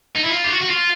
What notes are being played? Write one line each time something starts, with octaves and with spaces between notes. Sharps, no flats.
D#4
E4
F4
G4
F#4
F#4
F4